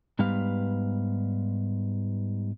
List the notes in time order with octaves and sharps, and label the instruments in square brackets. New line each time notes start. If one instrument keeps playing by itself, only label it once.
[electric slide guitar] G#2 G3 B3 B4 F5